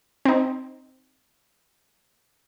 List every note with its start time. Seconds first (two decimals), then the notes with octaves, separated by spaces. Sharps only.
0.25 C4 D#4